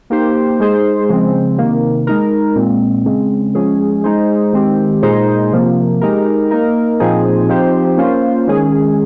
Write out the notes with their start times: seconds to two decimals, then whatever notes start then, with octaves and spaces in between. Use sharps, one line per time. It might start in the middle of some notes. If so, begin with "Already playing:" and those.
0.10 A#3 D#4 G4 C5
0.60 G#3 D#4 G#4 C5
1.09 C#3 F3 G#3 C4
1.58 C3 D#3 A#3
2.07 G#3 D#4 A#4
2.56 A#2 G#3 C4
3.06 C#3 G#3 C4
3.55 F3 G#3 C#4 G#4
4.04 G#3 D#4 G#4 C5
4.53 D#3 G#3 C4 G4
5.02 A#2 G#3 D#4 G#4 C5
5.52 C3 F3 A#3
6.01 G#3 D#4 G4 A#4
6.51 A#3 D#4 A#4
7.00 A#2 F3 C4 D#4 G#4
7.49 F3 C4 D#4 G4 C5
7.97 A#3 C#4 F4 C5
8.47 D#3 G#3 C#4 G#4